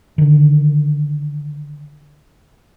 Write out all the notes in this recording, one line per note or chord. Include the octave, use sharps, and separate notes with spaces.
D3 D#3